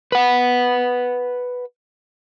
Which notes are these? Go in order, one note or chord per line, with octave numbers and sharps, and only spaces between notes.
B4 F#5